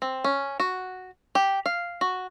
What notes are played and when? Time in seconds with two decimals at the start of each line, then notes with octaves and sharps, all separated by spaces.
0.02 C4
0.24 C#4
0.60 F#4
1.35 G4
1.66 F5
2.01 F#4